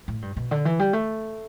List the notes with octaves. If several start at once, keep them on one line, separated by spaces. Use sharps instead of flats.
A2
G2
B2
D3
E3
G3
A3